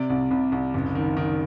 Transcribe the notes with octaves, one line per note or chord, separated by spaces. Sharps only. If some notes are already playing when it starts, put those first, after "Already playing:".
Already playing: C3 D5
C2
C2
C2
F#1
D#3
D#3